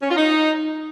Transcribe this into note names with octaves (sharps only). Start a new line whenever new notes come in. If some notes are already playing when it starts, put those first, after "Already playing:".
C#4
F4
D#4